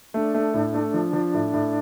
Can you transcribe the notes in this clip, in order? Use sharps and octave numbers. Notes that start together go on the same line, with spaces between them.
A3 D4
A3
A2
A3
F3
F3
A2
A2